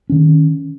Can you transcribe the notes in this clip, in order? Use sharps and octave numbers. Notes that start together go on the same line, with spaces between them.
D#3 C#4